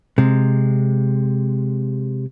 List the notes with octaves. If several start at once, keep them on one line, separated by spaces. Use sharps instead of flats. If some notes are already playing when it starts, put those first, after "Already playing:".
C3 G#3